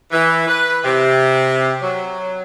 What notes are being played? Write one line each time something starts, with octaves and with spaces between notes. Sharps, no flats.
E3
B4
C3
F#3